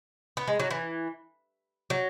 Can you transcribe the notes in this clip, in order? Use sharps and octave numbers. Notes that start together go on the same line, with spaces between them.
B3
G#3
F#3
E3
F#3